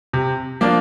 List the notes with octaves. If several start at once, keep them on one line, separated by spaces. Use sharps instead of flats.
C3
F3 A#3 D4 F4